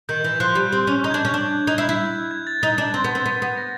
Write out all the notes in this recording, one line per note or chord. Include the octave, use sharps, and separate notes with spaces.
D#3 G6
E3 G6
F3 F#6
G3
C4
C#4
D#4 G6
G#6
D4 G6
C#4
D4
D#4 G#6
E4 G6
G#6
E4
G#6
A6
D#4 A6
D4
C4
B3
C4
B3
B3
A#6